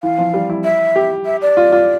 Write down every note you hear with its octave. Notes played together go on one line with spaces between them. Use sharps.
E3 F5
F3
G3
E4
E5
G4
E5
D5
F4
F4